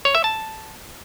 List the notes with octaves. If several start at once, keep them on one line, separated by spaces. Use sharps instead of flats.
C#5
E5
A5